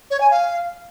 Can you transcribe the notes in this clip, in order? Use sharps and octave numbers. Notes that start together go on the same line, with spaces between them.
C#5
G#5
F5